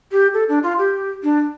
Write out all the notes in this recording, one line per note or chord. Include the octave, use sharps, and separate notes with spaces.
G4
A4
D4
F4
G4
D4